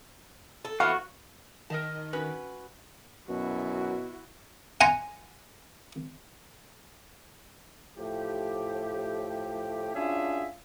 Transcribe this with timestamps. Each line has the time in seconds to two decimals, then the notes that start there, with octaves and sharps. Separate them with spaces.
0.65 A4
0.80 E3 A3 B3 F#4 F5
1.70 D#3 A#4 D#5 A5
2.13 C#4 F#4 B4
3.29 F#2 B2 E4 F#4
4.81 F#5 G#5 A#5 C6
7.98 A2 F3 A3 G4
9.94 C#4 D4 F4 F#4 G#4 E5